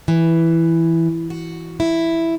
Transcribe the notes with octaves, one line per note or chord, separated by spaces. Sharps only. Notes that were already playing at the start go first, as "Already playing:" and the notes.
E3
F#4
E4